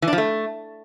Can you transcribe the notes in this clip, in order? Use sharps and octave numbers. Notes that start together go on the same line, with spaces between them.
E3
D4
F3
A3